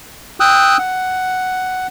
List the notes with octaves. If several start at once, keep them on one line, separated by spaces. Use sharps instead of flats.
G5 D#6 E6 F#6
F#5